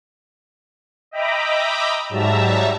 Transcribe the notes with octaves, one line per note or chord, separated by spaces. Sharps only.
D#5 E5 G5 A#5 B5 D6
G#2 F#3 G3 E5 A5 A#5